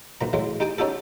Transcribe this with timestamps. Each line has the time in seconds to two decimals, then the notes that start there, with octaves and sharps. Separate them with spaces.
0.21 B1 A#2 A#5
0.33 A2 F#3 G#3
0.60 D#4 G4 G5 G#5
0.78 C#4 D#4 F#4 G4 A4